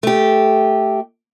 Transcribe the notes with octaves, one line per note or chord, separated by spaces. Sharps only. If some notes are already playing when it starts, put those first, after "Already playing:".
A3 G4